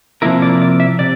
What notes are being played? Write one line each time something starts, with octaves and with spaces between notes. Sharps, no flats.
C3 F3 A#3 E4 A#4
D5
D5
E5
C3 D5